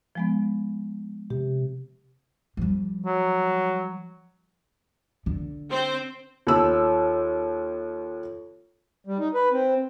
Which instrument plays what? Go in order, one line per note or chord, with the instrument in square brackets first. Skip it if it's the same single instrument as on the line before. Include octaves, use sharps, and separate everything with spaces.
[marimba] F3 G#3 B3
[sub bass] C3 [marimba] G4
[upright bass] F3 G3
[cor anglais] F#3
[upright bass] D3
[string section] C4 C5
[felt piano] D#2 E6 [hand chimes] F4 A4 C#5
[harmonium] G3
D#4
B4
C4